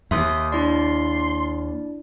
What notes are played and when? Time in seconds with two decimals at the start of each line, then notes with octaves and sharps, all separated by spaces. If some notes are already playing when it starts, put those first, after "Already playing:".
0.11 D#2 E5 C6 D#6
0.52 D4 E4 D5 C6